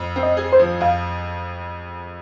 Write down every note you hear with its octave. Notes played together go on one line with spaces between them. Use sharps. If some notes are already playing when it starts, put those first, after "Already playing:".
Already playing: F2
C4
D#5
G#4
C5
F3
F2 F5